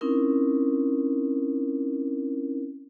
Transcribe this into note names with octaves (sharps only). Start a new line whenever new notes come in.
C4 C#4 D#4 E4 A#4